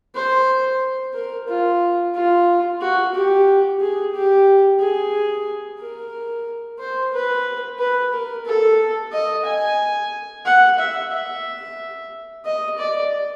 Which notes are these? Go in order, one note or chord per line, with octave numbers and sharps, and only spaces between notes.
C5
A#4
F4
F4
F#4
G4
G#4
G4
G#4
A#4
C5
B4
B4
A#4
A4
D#5
G#5
F#5
E5
E5
D#5
D5